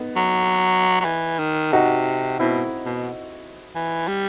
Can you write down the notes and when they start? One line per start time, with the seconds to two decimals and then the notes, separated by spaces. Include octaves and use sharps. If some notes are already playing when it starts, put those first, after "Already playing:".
Already playing: B3 D#4
0.16 F#3
1.00 F#3
1.05 E3
1.39 D#3
1.72 C3 D#4 F#4
2.39 B2 C4 E4
2.85 B2
3.75 E3
4.07 G3